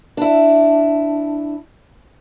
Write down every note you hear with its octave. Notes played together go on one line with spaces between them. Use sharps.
D4 E4